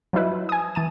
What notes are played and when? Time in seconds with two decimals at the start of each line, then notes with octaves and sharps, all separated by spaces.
0.13 F3 F#3 D#4 E4 B4
0.49 G#5 D#6
0.75 E3 A5 D#7